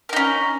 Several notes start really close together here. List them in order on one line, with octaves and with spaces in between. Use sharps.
A#4 D#4 C#4